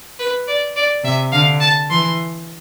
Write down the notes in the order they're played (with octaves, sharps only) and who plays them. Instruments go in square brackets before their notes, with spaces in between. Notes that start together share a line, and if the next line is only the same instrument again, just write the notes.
[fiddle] B4
D5
D5
[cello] C3 [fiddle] E5
[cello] D3 [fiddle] F5
[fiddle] A5
[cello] E3 [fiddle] C6